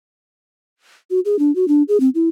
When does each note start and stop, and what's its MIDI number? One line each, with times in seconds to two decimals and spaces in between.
1.10 1.20 66
1.25 1.38 68
1.39 1.54 62
1.55 1.67 66
1.68 1.83 62
1.88 2.00 68
2.00 2.09 60
2.15 2.29 64